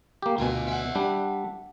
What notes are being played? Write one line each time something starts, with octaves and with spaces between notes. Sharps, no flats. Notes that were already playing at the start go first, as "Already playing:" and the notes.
A#3 G4
D2 B2 F4 G#5
E5 F#5
G3 D4